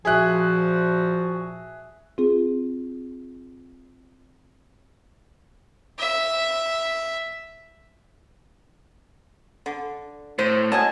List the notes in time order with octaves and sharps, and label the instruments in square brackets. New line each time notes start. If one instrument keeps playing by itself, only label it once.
[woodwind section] A#2 F3 F#4 [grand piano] G#4 E5 F#6
[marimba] C4 F4 G#4
[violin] E5
[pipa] D3
[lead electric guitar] A2 [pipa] C5
[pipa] F#3 D#5 G#5 [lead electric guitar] A5